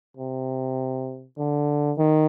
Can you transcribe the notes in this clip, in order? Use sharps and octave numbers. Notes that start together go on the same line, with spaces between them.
C3
D3
D#3